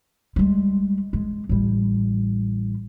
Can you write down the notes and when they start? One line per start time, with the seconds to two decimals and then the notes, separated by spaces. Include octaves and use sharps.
0.36 G3 G#3
1.13 G#3
1.49 A1 G3